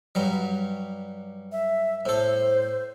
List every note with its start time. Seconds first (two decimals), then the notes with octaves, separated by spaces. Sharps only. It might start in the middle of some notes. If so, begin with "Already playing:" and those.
0.15 G2 F#3 G3
1.52 E5
2.06 A2 A4 C5